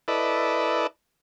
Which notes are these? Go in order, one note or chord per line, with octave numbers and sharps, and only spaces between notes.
E4 A4 B4 D5 D#5